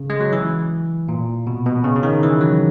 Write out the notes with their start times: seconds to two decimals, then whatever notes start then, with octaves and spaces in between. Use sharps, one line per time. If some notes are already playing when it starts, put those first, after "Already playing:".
Already playing: C#3
0.10 G#3
0.20 F#3
0.33 E3
1.09 A#2
1.47 B2
1.66 B2
1.84 C#3
1.96 C#3
2.03 D#3
2.23 E3
2.41 F#3